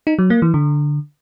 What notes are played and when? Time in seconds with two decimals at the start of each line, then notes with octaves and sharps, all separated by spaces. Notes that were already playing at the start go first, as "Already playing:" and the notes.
0.07 D#4
0.19 F#3
0.30 A#3
0.42 E3
0.54 D3